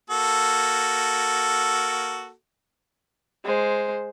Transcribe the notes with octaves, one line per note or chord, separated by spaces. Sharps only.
A#3 F#4 A4
G#3 C5